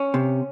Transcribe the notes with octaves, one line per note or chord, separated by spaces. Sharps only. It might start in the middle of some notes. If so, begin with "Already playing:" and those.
Already playing: C#4
C3